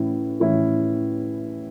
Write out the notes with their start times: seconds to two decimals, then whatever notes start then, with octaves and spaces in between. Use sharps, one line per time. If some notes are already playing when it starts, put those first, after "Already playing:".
Already playing: A2 E3 C#4 E4
0.40 A2 E3 C#4 E4